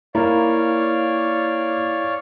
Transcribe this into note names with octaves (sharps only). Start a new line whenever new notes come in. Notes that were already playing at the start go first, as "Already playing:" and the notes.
A#3 E4 C#5 D5 F5